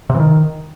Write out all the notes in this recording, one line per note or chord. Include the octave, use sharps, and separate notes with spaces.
C3
E3
D#3